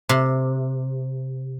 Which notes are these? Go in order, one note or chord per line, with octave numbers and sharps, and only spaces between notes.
C3